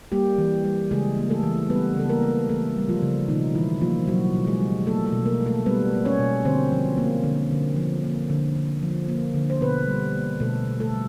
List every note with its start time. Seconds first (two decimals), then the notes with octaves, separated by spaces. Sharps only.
0.12 G3 A#3 G4
0.38 E3
0.64 G3
0.91 C#3 G#3 G#4
1.18 A#3
1.30 A3 A4
1.43 E3
1.70 G3 B3 B4
1.96 C#3 A4
2.09 A#3 A#4
2.23 A#3
2.49 E3 A3 A4
2.76 G3
2.89 F3 F4
3.03 C#3
3.28 B2 D#3 D#4
3.55 E3 G3 E4
3.81 F3 A#3 F4
4.07 B2 F#3 F#4
4.34 B2
4.47 G#3 G#4
4.60 G3
4.86 A3 A#3 A4
5.06 A3 A4
5.13 B2
5.26 A#3 A#4
5.40 B2
5.46 A3 A4
5.66 G3 B3 B4
5.93 A#3
6.05 C#4 C#5
6.19 B2
6.45 D3 C4 C5
6.72 F3
6.98 A#3
7.24 D3
7.51 D3
7.76 F3
8.04 A#3
8.30 D3
8.56 D3
8.83 F3
9.09 A#3
9.35 D3
9.50 C5
9.61 B2 B3 B4
9.87 G3
10.14 A#3
10.40 B2 A3 A4
10.67 B2
10.80 A3 A4
10.93 G3